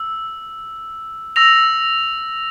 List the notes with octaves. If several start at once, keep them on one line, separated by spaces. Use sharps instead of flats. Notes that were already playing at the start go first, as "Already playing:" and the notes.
Already playing: E6
E6 A#6 F7